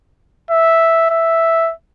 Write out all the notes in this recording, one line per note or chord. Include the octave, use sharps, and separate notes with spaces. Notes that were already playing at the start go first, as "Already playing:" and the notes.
E5
E5